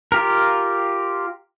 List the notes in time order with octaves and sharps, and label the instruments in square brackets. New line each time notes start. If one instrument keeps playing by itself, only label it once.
[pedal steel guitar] F4 G4 A#4